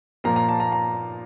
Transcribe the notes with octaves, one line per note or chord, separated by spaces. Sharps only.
A#2 F3 A#3 A#5
A#5
A5
A#5
A#5